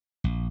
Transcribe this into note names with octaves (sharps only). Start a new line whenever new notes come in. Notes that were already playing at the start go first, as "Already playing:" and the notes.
A#1